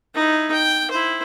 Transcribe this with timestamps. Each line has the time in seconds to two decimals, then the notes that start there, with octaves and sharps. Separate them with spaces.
0.15 D#4 E4
0.52 G5
0.90 E4 C5